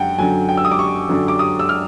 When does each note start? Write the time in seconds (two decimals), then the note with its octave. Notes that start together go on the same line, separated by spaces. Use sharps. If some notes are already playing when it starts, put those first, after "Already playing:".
Already playing: F#2 D3 F#3 F#5 G5
0.18 F#2 D3 F#3 G#5
0.49 G5
0.57 E6
0.65 D#6
0.72 D6
0.79 C#6
1.09 F#2 D3 F#3
1.28 D6
1.39 D#6
1.59 E6
1.69 F6